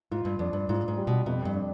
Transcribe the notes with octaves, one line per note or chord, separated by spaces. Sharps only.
G#2 F4
G2
F2 D4
G2
G#2 F4
G#2
G3
B2
F2 B2
G2
D4